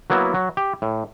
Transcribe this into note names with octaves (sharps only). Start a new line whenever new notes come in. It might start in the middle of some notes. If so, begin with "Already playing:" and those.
F#3 A#3 B3 E4
F#3
G4
A2